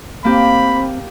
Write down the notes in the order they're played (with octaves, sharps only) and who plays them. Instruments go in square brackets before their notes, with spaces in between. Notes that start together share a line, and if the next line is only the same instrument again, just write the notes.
[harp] A#3 G4 [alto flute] C4 [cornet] B5